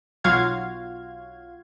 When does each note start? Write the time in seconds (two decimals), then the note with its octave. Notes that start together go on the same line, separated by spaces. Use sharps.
0.24 B1 F#3 F4 F#4 F5 G#6